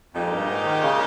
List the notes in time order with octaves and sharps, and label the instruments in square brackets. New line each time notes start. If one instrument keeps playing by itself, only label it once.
[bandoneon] F2 [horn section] A#2 G#3 D#4 G4 A#4
[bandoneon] G2
G#2
D#3
C#3